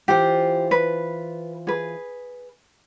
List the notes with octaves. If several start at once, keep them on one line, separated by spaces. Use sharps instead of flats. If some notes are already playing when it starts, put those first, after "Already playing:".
E3 F4 G4 C5
B4
G#4 B4